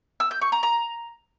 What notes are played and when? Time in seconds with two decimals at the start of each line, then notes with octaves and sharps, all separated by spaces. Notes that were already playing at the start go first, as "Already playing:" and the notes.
0.20 E6
0.31 G6
0.41 C#6
0.52 A#5
0.63 A#5